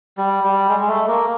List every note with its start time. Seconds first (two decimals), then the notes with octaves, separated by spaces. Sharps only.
0.17 G3
0.44 G3
0.69 G#3
0.80 G#3
0.88 A3
1.08 A#3